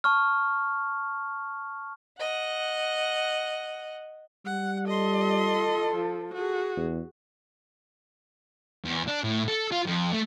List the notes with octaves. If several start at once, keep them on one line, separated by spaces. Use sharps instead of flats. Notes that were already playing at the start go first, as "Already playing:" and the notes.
A5 C#6 F6
D#5 F#5
G3 F#5
F4 A4 D#5 C6
F3
F#4 G#4
E2
E2
D4
A2
A4
F4
F2
A3